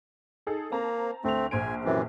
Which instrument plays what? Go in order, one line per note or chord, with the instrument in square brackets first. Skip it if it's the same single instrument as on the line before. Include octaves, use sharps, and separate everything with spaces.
[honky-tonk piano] D#4 G#4 A4
[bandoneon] A#3 [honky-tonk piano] C4 A5 A#5
[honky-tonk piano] D2 F7 [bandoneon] A3 C4
[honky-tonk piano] A#1 C5 D7 [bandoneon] G#5
[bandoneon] F#2 C3 E3